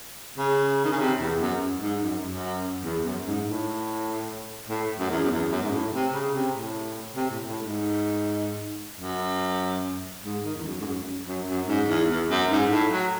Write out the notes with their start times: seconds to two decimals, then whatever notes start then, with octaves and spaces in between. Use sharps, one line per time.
0.38 C#3
0.85 D#3
0.92 C#3
1.00 C3
1.20 E2
1.40 F#2
1.81 G#2
2.02 F#2
2.22 F#2
2.84 E2
3.04 F#2
3.26 G#2
3.46 A2
4.69 A2
4.99 F#2
5.10 E2
5.24 F#2
5.31 E2
5.51 F#2
5.62 G#2
5.72 A2
5.93 C3
6.13 C#3
6.34 C3
6.54 A2
7.16 C3
7.31 A2
7.47 A2
7.63 G#2
9.00 F#2
10.24 G#2
10.45 D#3
10.55 E2
10.65 F#2
10.81 G#2
10.86 F#2
11.27 F#2
11.47 F#2
11.67 G#2
11.88 E2
12.09 E2
12.30 F#2
12.50 G#2
12.70 A2
12.91 F#3